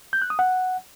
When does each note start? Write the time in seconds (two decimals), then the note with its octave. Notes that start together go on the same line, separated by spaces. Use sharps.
0.13 G6
0.22 F#6
0.30 D#6
0.39 F#5